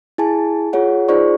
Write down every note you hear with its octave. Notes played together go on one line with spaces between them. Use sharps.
E4 G#4 G#5 A5
F4 G#4 C#5 F#5
D#4 F4 G#4 C5 D5 C#6